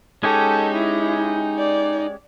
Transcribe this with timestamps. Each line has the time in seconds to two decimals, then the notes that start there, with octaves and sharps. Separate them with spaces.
0.23 G#3 C#4 D#4 G4 A4
0.75 E4
1.58 D5